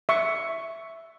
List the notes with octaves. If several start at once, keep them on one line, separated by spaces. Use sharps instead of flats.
E5 C#6